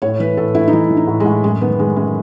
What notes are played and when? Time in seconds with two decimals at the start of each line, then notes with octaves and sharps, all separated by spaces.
0.02 A2 C#5
0.20 E3 B4
0.37 A2 A4
0.55 A2 E4
0.68 D#4
0.73 E3 E4
0.91 E3
0.97 D#4
1.08 A2
1.20 G#3
1.26 A2
1.44 F#2 G#3
1.61 D#3 B3
1.79 D#3 G#3
1.96 F#2 G#3